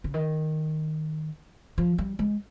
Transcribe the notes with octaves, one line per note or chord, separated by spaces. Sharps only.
C#3
D#3
F3
G3
G#3